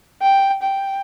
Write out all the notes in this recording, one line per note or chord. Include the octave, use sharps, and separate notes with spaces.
G5
G5